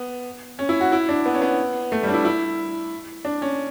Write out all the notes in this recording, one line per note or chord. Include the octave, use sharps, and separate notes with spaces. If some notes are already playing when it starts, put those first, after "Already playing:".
Already playing: B3
C#4
E4
F#4
E4
D4
B3
C#4
B3
A3
G3
D4
E4
E4
D4
C#4